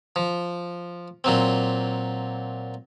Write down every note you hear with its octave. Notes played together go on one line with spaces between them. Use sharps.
F3
A#2 F#3 C4